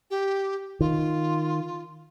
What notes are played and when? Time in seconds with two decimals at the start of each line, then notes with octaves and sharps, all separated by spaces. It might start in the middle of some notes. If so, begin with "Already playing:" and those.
0.11 G4
0.81 D#3 F4